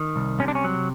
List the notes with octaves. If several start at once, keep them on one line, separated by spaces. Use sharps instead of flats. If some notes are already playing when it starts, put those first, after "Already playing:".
Already playing: D#3
C2
C3 C#4
D4
C#4
F#3